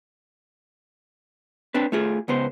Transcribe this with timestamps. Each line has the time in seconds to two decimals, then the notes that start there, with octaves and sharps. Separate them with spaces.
1.74 C4 D4 B4
1.92 A3 F4 G#4
2.28 C#2 B3 C5